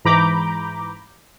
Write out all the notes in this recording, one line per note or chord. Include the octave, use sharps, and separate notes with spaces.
G#2 E3 A#5 B5 D6 G6